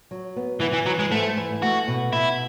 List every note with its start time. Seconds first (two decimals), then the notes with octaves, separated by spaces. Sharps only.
0.11 F#3
0.36 B3
0.61 E3 B3
0.73 E3
0.86 E3 F#3
1.00 G#3
1.11 G#2 A3
1.37 E3
1.63 A3 F#4
1.88 B2
2.13 B2 E4